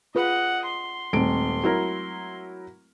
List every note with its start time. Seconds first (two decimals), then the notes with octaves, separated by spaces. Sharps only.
0.15 F4 G#4 B4 D#5 F#5
0.66 C6
1.13 D#1 G#3 A3 C4 D7
1.64 F#3 E4 A#4